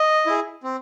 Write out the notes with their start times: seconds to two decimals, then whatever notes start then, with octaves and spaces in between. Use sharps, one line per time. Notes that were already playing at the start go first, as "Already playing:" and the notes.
Already playing: D#5
0.26 E4 G#4
0.63 C4